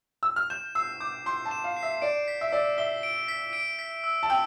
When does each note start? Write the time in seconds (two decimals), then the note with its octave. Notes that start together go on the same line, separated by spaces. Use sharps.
0.23 E6
0.36 F6
0.50 G6 E7
0.75 E6 C7
1.00 D6 G6
1.26 C6 G6
1.45 A5
1.51 E7
1.64 F5
1.76 C7
1.83 E5
2.02 D5 D7
2.28 B6
2.41 E5
2.52 D5 E6
2.78 E5 G7
3.03 D7
3.28 B6
3.53 D7
3.79 B6
4.04 E6
4.23 A5
4.30 G5 E6